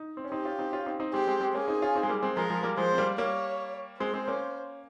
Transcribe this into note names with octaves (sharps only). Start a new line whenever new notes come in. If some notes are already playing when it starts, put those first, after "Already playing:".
Already playing: D#4
C4
C#4
C4 D#4 G4
C#4 F4
C4 D#4
C#4 F4
C4 D#4
C4 D#4
G#3 C4 G4
G#3 C4
G#3 C4
A#3 C#4 G#4
C4 D#4
C#4 F4
C4 D#4
G#3
G3 A#3
G#3 C4
F3 G#3 A#4
F3 G#3
G3 A#3
F3 G#3 C5
C4
G3 A#3
G3 A#3 C#5
G#3 C4 C5
G#3 C4
A#3 C#4